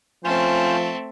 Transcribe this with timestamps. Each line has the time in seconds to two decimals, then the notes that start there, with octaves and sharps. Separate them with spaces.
0.24 F3 A3 C4 C#4 F4 C5